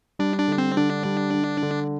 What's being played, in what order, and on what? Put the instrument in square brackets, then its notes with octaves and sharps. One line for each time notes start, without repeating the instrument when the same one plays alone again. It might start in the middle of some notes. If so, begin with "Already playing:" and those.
[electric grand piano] G3 [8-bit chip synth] D4
[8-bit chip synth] D4
[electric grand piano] D3
[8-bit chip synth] C4
[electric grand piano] D3 [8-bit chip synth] D4
[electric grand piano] G3
D3
D3